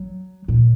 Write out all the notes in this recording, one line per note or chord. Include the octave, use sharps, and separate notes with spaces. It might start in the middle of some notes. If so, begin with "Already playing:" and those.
Already playing: F#3
A#2